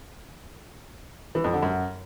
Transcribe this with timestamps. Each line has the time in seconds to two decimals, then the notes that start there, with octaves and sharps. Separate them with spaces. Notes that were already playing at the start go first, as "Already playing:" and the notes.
1.35 E3
1.44 F2
1.53 D3
1.62 F#2